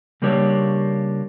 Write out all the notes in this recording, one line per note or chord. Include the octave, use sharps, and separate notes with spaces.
C#3 G3 A#3 D4 G4 C#5